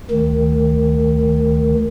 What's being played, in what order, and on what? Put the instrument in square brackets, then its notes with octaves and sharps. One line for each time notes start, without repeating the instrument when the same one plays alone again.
[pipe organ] D2 D#3